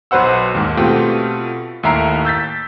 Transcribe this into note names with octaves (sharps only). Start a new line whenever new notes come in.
B1 F#3 B4 C5 F#5 E6
D#2 G#2
B2 A3 C4 F4 G4
D#2 A2 E5 A#5 C7 D7
E6 G6 A6 B6